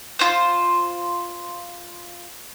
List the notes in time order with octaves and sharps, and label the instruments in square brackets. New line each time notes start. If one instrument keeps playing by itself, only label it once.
[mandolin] F4 C5